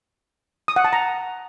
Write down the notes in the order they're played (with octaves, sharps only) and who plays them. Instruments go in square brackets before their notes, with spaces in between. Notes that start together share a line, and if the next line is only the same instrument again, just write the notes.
[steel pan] D#6
F#5
A5
A#5